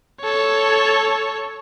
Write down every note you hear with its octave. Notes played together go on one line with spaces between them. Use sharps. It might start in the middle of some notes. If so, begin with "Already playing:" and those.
A4 C#5